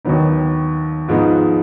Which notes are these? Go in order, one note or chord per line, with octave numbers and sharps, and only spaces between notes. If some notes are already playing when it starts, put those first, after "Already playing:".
D#2 D#3 F#3 B3 D#4
G#2 F3 G#3 B3 D#4